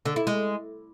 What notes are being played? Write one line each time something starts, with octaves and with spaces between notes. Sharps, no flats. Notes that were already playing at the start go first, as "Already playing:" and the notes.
D3
E4
G#3